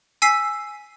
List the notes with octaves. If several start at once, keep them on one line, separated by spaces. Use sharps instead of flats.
G#5 E6 B6 C7